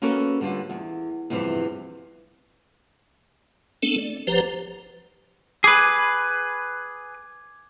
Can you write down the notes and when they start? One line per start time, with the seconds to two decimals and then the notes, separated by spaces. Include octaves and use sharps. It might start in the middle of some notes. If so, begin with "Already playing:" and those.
0.02 A#3 B3 C#4 F#4 A4 A#4
0.41 D3 G3 B3 F4
0.70 E2
1.30 E2 G2 C3 E3 F3
3.83 A3 B3 C4 D4 A4
3.98 D5
4.27 F#1 F3 G4 B4 C5 A#5
5.64 G#4 B4 D6 G#6